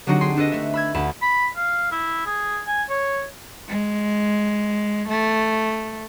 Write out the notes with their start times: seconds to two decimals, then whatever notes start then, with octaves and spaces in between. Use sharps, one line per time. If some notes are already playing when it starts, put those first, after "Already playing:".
0.07 D3 F#3 C4 D4 D#4 F#4
0.21 G#4 G5 C6
0.37 D4 A4 B4 D#5
0.52 A3 E5
0.74 B5 E6 G#6
0.94 D2 A5 B5
1.22 B5
1.57 F5
1.91 E4
2.26 G#4
2.67 G#5
2.89 C#5
3.67 G#3
5.08 A3